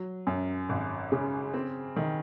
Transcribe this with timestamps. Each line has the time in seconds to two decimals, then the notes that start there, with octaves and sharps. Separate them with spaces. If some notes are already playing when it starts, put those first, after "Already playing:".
Already playing: F#3
0.27 F#2
0.69 G#1
1.12 C#3
1.54 C4
1.96 D#3